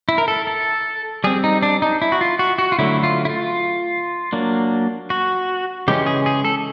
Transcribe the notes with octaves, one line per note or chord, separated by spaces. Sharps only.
E4
A#4
A4
A4
G3 C4 G#4
D#4
D4
D#4
E4
F#4
F4
F#4
F#4
F4
D3 F#3 A3 E4
F4
E4
F4
F#3 A#3 D4
F#4
C#3 E3 G#3 C#4 G4
G#4
G#4
A4